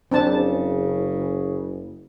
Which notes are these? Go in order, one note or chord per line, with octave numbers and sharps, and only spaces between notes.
F#1 C#3 C4 D4 A5